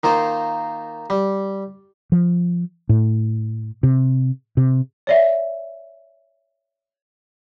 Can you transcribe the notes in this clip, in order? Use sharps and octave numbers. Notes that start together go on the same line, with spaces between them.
D#3 A#3 F4 C5
G3
F3
A2
C3
C3
C#5 D5 E5